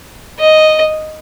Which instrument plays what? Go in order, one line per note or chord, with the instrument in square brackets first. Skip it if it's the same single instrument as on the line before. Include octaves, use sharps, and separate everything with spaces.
[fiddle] D#5